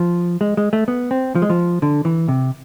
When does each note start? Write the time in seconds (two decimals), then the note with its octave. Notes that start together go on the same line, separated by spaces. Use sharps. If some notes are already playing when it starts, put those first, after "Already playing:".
Already playing: F3
0.41 G#3
0.57 G#3
0.73 A3
0.88 B3
1.11 C4
1.35 F3
1.42 G#3
1.50 F3
1.82 D3
2.05 E3
2.29 C3